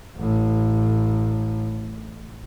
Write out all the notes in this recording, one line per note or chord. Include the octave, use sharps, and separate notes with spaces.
A1 A2